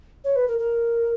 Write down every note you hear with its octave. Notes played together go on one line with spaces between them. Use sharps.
C#5
B4
A#4
A#4